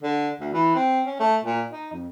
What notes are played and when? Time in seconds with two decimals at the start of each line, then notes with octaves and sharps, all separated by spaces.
0.03 D3
0.40 D2
0.53 E3
0.75 C4
1.06 C#4
1.20 A3
1.44 A#2
1.72 D#4
1.92 F2